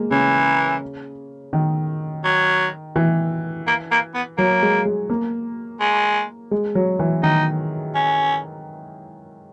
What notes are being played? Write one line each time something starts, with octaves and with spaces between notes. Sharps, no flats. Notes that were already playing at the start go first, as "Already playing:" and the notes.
Already playing: G#3 A#3
C#3 E3
D#3
F#3
E3
A#3
A#3
B3
F#3 A#3
G#3
G#3
A#3
G#3
G#3
F#3
E3
D#3 D#4
C#4